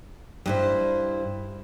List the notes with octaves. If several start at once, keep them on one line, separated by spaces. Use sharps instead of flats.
G2 E4 C5